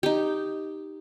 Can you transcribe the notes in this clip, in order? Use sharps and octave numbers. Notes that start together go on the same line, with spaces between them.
D#4 G4